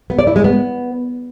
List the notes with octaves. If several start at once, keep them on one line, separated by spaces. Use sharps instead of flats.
B3
D5
E4
G#3
B3